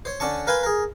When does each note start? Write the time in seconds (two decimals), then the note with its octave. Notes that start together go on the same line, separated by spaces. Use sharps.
0.05 C5 C#5
0.20 D3 C#4 D5 A5 C#6
0.47 A#4 B4 F5 G#5 B5 C6
0.63 G#4 A#4